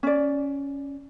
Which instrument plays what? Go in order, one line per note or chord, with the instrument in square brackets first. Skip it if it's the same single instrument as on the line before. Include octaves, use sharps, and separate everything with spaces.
[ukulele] C#4 D5